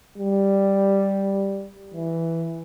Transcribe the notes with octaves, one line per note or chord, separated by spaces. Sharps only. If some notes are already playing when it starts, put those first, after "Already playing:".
G3
E3